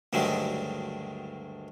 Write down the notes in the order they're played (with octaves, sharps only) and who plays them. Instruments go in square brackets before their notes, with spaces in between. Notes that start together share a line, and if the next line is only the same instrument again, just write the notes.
[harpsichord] D2 G2 D3 D#3 F#3 G#3